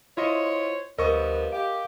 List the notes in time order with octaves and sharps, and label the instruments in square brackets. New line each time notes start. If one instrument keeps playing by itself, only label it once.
[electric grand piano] E4 F4 D#5 [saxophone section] C5 C#5
[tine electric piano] D2 [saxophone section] G2 F3 B3 [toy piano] A#4 [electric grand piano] D#5 C#6
[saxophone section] G4 [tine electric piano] F5